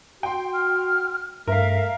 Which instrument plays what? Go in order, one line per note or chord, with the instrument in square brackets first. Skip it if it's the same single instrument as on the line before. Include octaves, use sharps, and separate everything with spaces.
[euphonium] F#4 [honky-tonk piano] G5 C6
[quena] F6
[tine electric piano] G2 [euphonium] A3 [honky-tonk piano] A#4 F5 [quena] E5